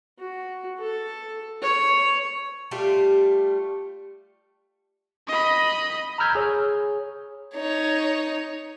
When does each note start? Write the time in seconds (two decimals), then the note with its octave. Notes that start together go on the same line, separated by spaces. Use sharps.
0.19 F#4
0.79 A4
1.62 C#5
2.71 G3 A3 F4 G4
5.28 D#5 B5
6.18 A#5 B5 E6 F6 G6 G#6
6.35 G#4 C#5
7.55 D#4 C#5